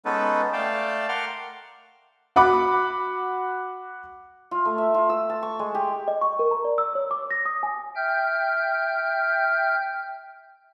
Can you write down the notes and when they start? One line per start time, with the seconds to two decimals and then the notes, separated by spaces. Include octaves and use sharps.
0.05 G#3 B3 C#4 D#4 A4 B4
0.53 A3 D5 F5 G5 A5
1.09 A#4 F#5 C6 D6 F6
2.36 F#4 F#5 B5 D6
4.51 F4
4.65 A3
4.78 E5
4.94 F4
5.10 E6
5.30 A5
5.43 C#6
5.59 G#3
5.75 G4
6.08 D#5
6.21 C#6
6.39 A#4
6.51 A#5
6.65 D5
6.78 E6
6.95 C#5
7.11 D6
7.31 A#6
7.46 D#6
7.63 G#5
7.96 E5 G5 F6 G6